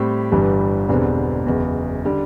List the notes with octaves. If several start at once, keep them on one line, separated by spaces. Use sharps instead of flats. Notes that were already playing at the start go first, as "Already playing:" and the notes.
Already playing: A2 G3 C4 G4
G1 G2 E3 G3
E1 E2 D3 G3 C4
F#1 E2 B2
D3 G3